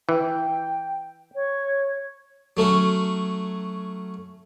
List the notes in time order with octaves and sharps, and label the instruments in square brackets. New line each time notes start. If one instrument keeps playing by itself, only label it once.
[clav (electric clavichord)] E3 [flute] G5
[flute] C#5
[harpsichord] F#3 A3 C#4 F#4